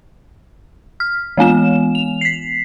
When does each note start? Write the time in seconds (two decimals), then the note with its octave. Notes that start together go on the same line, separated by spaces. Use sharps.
1.00 F6
1.37 E3 G#3 B3 E7
1.95 F7
2.21 B6 C7